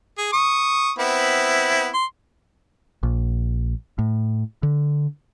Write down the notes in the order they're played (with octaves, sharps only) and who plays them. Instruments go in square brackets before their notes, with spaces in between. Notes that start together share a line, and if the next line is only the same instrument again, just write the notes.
[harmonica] G#4
C#6 D#6
B3 C4 E4
C6
[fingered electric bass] A#1
A2
D3